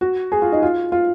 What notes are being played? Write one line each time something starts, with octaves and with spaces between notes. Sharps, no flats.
F#4
G#4
F4
D#4
F4
F4